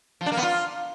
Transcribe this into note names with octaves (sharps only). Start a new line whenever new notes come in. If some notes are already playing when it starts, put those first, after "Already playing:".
F3
D4
A#3
B3
F4